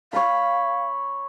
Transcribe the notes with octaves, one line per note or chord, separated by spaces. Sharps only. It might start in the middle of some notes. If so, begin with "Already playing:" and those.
C#5 F5 B5